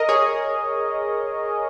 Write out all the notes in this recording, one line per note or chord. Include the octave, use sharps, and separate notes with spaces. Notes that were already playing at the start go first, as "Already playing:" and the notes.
Already playing: A#4 D#5
G#4 C#5